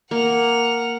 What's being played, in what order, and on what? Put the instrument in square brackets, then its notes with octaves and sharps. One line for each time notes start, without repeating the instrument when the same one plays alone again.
[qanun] A#3 [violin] F#5 F7